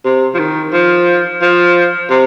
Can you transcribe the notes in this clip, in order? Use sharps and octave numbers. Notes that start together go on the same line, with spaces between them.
C3
F3
D#3
F3
F3
C3